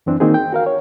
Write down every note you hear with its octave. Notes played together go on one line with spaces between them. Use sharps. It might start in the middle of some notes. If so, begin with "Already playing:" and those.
F#2 E3 C4 D4
D#3 A#3 C4 D#4 F#4 G#4
G5
F#4 A#4 F5
C#5